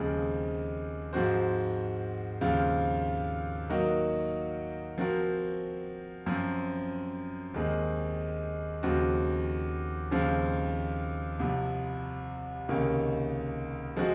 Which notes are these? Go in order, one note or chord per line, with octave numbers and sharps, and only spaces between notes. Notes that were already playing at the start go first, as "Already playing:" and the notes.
Already playing: D#2 C#3 F3 G#3 C4
G#2 F3 C4 F#4 C5
D#2 C#3 F3 C4 F4
D#3 F#3 A#3 D#4 F#4
F3 C4 F#4 A#4
F#2 F3 C4
D#2 D#3 G#3 C4
D#2 C#3 F3 C4 F#4
D#2 C#3 F3 C4 F4
C2 C3 F3
C#2 C3 D#3 A#3 C#4
F3 G#3 C4 F#4